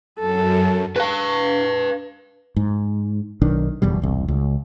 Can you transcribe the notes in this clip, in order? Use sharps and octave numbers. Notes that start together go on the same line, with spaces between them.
F#2 A4
B4 F5
G#2
B1 D#3 D4
F#1 E2 B2 G3
E1 C2
C#2